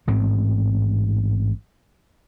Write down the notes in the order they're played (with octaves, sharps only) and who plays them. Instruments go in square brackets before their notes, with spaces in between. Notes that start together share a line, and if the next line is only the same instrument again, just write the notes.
[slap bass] A1 G#2 C4